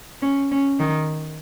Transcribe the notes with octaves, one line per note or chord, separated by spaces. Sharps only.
C#4
C#4
D#3